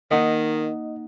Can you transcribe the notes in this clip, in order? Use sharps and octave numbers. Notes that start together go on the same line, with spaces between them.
D#3 A#3 D#4 D#5 F#5 D#6